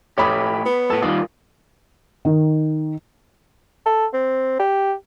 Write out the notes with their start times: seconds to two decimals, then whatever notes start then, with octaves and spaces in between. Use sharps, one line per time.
0.18 A2 A3 G4 C#5 B5 D#6
0.66 B3
0.90 A2 A4
1.02 D#3 G3 F4 D#6
2.25 D#3
3.86 A4
4.13 C4
4.59 G4